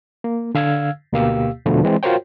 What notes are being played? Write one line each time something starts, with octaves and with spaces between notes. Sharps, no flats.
A#3
D3 F5 E6 F6 G#6
D2 B2 A#3 G4 F5 E6
E2 B2 D3 F3 A3
E3 G#3 C4
F4 F#4 A#4 C5 C#5 G5